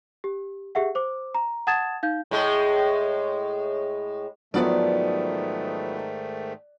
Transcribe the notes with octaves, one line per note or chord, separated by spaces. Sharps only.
G4
G4 G#4 E5 F#5
C5 D6
A#5
F#5 A5 D#6 G#6 A6 E7
D#4 F5 G6
A2 G#3
G#2 D#3 F3 F#3 A3 B3 D5